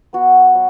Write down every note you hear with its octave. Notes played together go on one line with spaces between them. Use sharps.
B3 F#4
F#3